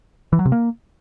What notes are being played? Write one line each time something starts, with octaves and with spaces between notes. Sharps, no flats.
E3
F#3
C3
A#3